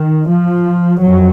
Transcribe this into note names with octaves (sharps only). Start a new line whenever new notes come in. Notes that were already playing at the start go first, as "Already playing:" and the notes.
Already playing: D#3
F3
F2 F#3